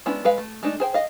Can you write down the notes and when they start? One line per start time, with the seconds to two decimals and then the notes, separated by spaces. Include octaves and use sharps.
0.06 G#3 B3 C#4 D4 E4
0.25 G#3 B4 F5
0.38 A3
0.63 G#3 A3 D4 D#4
0.80 G#4 C5 G5
0.94 D#5 F5